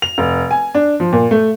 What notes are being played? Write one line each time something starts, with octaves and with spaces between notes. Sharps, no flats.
F7
F1
G#5
D4
F3
A#2
A3